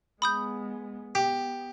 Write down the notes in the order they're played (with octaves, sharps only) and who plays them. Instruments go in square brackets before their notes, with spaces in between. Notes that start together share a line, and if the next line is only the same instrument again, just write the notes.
[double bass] G#3 B3 [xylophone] B5 D#6 G6
[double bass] B3 [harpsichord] G4